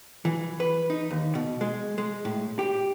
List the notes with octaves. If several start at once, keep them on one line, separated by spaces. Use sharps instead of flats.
E3
B4
D#4
D#2
B2
G#3
G#3
A2
G4